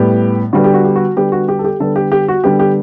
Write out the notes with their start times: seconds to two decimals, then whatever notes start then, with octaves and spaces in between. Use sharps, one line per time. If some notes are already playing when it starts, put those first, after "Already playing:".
Already playing: A2 G3 B3 G4
0.53 D3 G3 B3 F#4
0.64 G4
0.74 F#4
0.84 G4
0.96 F#4
1.16 D3 G3 B3 G4
1.32 F#4
1.48 G4
1.59 A4
1.64 G4
1.80 D3 G3 B3 A4
1.96 G4
2.12 G4
2.28 F#4
2.44 D3 G3 B3 G4
2.59 G4